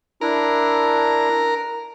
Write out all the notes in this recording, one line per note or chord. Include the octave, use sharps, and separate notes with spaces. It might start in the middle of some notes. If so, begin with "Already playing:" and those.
D4 E4 A#4